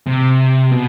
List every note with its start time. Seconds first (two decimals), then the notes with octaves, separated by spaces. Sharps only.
0.07 C3
0.72 B2